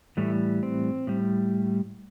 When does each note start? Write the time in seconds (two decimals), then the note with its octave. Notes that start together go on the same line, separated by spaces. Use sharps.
0.17 A2 E3 G3 A3
0.63 C4
1.07 A2 G3